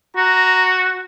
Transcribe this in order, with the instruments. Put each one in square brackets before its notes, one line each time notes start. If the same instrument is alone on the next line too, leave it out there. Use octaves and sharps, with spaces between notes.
[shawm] F#4 [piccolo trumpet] A#5